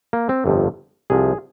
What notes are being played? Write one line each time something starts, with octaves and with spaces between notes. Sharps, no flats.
A#3
C4
G1 F2 C3 F3
C2 C3 F3 G#4